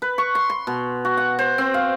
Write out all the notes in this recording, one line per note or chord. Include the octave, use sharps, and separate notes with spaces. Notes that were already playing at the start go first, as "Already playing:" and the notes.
B4
C#6
C6
C6
B2
F#4
F#5
C5
C4
F5